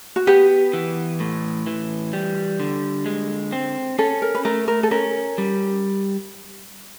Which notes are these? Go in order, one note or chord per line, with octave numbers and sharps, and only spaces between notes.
F#4
B3 G4
E3
A2
E3
G3
D3
G#3
C4
C#4 A4
A#4
B4
A3 A#4
A#4
A4
C#4 A#4
G3